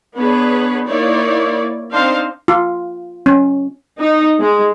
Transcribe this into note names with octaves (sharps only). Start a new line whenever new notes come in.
B3 D4 G#4 B4 C#5
A#3 D#4 E4 C#5 D5
C4 D4 D#4 C5 F5
F4
C#4
D#4
G#3